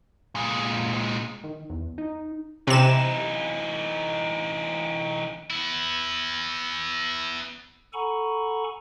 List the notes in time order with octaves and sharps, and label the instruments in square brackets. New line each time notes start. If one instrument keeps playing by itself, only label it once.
[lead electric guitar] A#2 G#3
[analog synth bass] D#3
E2
D#4
[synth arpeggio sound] C3 E7 [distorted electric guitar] E3 D#4
[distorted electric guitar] B3 E4
[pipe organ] A4 F#5 G#5 A#5 B5 C#6